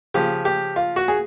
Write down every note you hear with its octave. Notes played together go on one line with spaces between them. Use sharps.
C#3 F3 G4
G4
F4
F#4
G#4